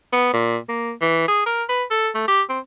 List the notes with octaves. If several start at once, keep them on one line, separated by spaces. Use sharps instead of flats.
B3
A#2
A#3
E3
G#4
A#4
B4
A4
A3
G4
C4